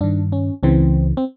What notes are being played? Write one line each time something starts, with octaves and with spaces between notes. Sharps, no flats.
G2 D#3 D4
C#4
C#2 C#3 E3 C4
C4